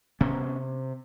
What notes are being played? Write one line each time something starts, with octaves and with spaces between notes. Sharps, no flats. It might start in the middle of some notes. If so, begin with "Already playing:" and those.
C3 B3 C#4